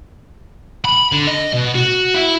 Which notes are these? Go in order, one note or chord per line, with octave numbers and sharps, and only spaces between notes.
B5
D3
D#5
B2
F#4
E4